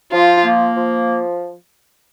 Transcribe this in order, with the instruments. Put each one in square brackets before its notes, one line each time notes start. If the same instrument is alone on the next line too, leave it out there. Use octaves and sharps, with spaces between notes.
[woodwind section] F3 [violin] F4
[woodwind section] A#3
F3